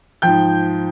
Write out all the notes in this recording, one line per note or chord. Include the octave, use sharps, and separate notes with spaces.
G#2 F3 G5 G6